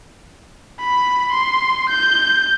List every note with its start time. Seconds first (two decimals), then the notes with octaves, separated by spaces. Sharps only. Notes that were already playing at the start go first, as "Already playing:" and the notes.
0.79 B5
1.32 C6
1.89 G6